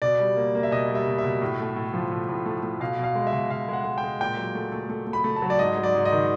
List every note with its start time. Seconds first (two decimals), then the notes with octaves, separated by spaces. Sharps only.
0.02 B2 D5
0.20 G3
0.36 A#3
0.55 A#3
0.63 E5
0.71 B2 D#5
0.90 G3
0.95 E5
1.07 B2
1.18 E5
1.24 B2
1.41 A2
1.60 A3
1.76 A2
1.93 F3
2.12 A2
2.29 A2
2.46 A3
2.63 A3
2.80 B2 F5
2.99 B2 F5
3.15 G#3
3.27 E5
3.33 B2
3.50 B2 F5
3.69 G#3 F#5
3.85 G#3
3.98 G5
4.03 G#3
4.21 A#2 G5
4.37 F#3
4.55 A3
4.72 A3
4.89 A3
5.07 A3
5.13 B5
5.24 A3
5.36 A5
5.42 F#3
5.50 D5
5.59 G#2 D#5
5.77 F#3
5.83 D5
5.95 G#2
6.05 D#5
6.12 D#3